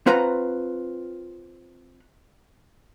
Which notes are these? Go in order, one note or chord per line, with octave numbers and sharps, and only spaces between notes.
C4 F4 B4 F#5 A#5